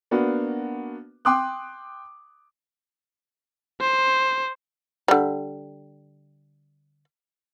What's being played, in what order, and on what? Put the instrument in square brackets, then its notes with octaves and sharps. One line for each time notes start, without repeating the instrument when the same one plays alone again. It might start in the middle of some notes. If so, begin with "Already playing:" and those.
[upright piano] A#3 B3 D4 F#4
G5 C6 D6 D#6 F#6
[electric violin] C5
[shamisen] D3 G3